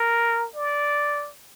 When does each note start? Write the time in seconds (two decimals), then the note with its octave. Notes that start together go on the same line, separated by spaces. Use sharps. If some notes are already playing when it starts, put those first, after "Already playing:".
Already playing: A#4
0.56 D5